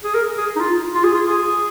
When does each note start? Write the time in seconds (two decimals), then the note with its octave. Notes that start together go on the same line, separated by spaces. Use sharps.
0.04 G#4
0.15 A#4
0.38 G#4
0.56 D#4
0.60 F4
0.95 F4
1.04 G#4
1.14 F4
1.30 G#4